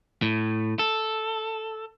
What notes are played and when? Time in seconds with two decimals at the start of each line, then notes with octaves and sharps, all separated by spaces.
0.22 A2
0.79 A4